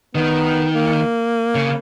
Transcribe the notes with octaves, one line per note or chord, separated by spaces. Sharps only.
D#3 B3
A#3
C#3